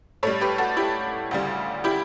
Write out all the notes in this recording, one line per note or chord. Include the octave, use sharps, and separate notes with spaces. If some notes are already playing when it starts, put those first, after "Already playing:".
A2 G3 A4 C#5
G4 B4
F#4 A4
E4 G4
D2 C#3 G3
E4 G4